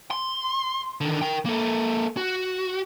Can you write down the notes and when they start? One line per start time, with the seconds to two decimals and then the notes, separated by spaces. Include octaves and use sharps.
0.11 C6
1.01 D3 D#3
1.22 A#4 G5
1.45 A#3 A4
2.17 F#4